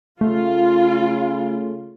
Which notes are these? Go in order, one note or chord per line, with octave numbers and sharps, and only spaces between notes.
C#3 A3 F4